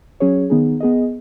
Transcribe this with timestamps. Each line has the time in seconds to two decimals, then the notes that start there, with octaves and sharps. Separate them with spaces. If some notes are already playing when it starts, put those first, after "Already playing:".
0.20 F#3 C#4 G#4 C#5
0.50 D#3 B3 D#4 G#4
0.80 B3 G#4 D#5